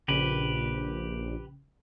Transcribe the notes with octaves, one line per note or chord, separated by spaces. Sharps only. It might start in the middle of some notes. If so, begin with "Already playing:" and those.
A#1 C#3 G4 B4